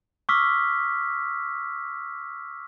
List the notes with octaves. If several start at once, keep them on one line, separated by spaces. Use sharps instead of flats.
C#6 D6 E6 F6 B6